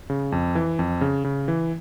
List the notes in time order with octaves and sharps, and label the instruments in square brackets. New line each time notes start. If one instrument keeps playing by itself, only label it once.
[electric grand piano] C#3
F2
E3
F2
C#3
C#3
E3